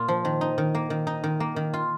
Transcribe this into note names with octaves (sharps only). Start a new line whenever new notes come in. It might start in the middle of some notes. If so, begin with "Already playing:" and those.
Already playing: A#2 A#3 F4
F3
D#3
D#4
D#3
A#3
D#3
D#4
D#3
A#3
D#3
F4